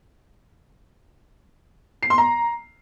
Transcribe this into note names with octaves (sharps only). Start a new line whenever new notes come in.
C7
C6
A#5